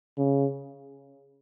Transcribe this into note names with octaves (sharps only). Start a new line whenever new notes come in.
C#3